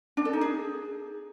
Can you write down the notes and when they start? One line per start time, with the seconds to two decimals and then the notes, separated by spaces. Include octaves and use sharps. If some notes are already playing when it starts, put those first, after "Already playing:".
0.17 D4
0.25 A4
0.33 D#4
0.41 G#4